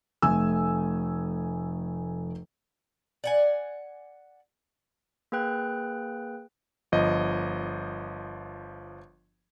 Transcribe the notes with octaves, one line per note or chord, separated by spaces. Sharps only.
F1 A3 G#5 E6
D5 F#5 G#5
A#3 G#4 B4 G5 F#6
G1 F3 D#5